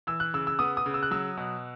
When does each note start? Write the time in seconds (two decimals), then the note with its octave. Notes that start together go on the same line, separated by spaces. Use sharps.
0.07 E3 E6
0.20 F#6
0.34 C#3 E6
0.47 E6
0.59 B3 D#6
0.77 D#6
0.86 C#3
0.94 E6
1.03 F#6
1.11 F#3 E6
1.37 B2